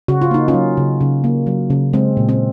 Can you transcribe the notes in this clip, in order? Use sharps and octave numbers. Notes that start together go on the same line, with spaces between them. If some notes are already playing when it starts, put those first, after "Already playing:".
C#3 F#4
F4
A#3 D#4
C#4 F4
F#3
C#3
C#3
A#3
F#3
C#3
G#3 C4
A#2
C4